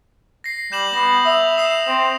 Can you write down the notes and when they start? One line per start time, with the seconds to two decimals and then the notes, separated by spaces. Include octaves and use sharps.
0.44 A#6 C7
0.72 G3 G6 E7 F#7
0.94 B3 G6 A#6
1.25 E5 D#6 F7
1.57 D#6 C7 E7
1.87 C4